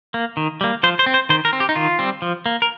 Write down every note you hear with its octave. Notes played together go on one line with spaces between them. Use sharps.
A#3
D#3
G3 A#3
F3 C5
C5
C4
C5
D#3 C5
A#4
C4
G4
D#4
D#3 F4
G3 C4
F3
A#3
A#4